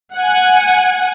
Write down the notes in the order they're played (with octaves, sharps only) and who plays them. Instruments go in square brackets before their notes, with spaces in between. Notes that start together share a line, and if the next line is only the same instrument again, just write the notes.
[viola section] F#5 G#5